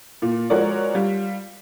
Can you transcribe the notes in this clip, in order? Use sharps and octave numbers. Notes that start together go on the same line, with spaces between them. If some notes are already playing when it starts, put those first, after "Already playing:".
A#2
F3 G#3 F#4 A#4 C#5 D5
G3 F4